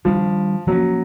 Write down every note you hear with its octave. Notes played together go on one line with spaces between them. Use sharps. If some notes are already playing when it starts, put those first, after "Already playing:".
D#3 F3 G3 B3 D4
F3 F#3 A#3 C#4